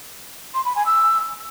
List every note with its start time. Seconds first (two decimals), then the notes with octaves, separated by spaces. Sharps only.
0.54 C6
0.65 B5
0.76 G#5
0.86 E6